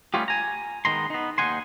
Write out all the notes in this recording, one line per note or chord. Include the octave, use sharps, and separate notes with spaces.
G3 A3 B3 C#4 F4 G4
G#5 A#5
D#3 G#3 B3 A#5 C6
B3 D#4
D#2 G#2 D#4 F#5 G#5 C6